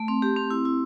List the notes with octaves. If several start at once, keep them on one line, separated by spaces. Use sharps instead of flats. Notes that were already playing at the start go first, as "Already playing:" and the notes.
Already playing: A3
C4
G4
C4
E4
E4